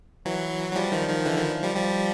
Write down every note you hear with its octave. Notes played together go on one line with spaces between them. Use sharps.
E3 F#3
F#3
F3 G3
D#3 F3
D#3 F3
D3 E3
D#3 F3
F3 G3
F3 G3